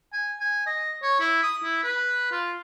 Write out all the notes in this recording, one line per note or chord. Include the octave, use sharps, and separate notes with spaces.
G#5
G#5
D#5
C#5
E4
D#6
E4
B4
F4